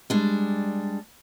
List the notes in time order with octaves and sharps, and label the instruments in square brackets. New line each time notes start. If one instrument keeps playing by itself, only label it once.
[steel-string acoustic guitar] G3 G#3 D4